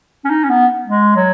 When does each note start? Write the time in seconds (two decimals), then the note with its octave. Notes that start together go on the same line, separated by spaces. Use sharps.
0.25 C#4
0.30 D#4
0.44 C#4
0.49 B3
0.86 G#3
1.15 F#3